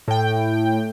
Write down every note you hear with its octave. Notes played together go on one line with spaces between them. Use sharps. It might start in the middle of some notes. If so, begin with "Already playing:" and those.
A2 G5